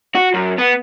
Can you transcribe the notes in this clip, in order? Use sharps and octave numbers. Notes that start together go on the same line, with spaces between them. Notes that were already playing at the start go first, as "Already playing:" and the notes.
F#4
F#2
B3